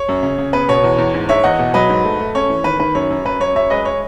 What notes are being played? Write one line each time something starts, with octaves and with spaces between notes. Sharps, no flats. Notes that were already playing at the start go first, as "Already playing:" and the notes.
Already playing: C#5
F#2
C#3
C#3
B3 B4
B2 C#5
E2
E2
G#2
G#2 C#5 E5
E2 D#5 F#5
B2
F#3 B4 D#5
G#2
A3
A3
C#4 C#5
E3
D#3 B4
D#3 B4
F#2 C#5
F#2
F#2 B4
F#2 C#5
F#2 C#5 E5
G#3 B4 D#5
C#5